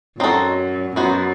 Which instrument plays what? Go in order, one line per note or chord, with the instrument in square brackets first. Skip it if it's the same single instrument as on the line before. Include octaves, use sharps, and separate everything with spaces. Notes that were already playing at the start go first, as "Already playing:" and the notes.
[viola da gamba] F#2 [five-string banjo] C4 D#4 F#4 A4
[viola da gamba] F#2 [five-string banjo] B3 D#4 F#4 C5